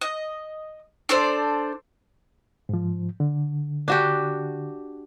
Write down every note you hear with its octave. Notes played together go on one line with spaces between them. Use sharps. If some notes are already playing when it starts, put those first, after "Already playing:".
D#5
D4 A4 C5 D5
G#2 F3
D3
D4 F#4 G4